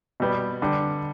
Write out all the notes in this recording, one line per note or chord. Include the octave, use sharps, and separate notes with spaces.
B2 G3 B3
D3 G3